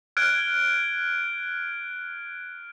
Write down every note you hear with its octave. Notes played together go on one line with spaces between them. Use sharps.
F6 F#6 G#6 D7